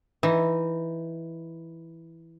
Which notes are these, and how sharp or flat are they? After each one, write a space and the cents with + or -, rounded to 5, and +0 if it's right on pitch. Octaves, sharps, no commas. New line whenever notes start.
E3 +0 D#4 +0